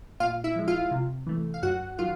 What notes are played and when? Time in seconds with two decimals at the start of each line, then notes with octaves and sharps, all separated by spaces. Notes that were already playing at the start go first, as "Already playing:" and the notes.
0.20 A#2 F4 F5
0.44 E4 E5
0.56 F3 G#3
0.68 F4 F5
0.91 C3
1.27 E3 A3
1.54 F5
1.63 F#2 F#4 F#5
1.98 D#3 F#3 F4 F5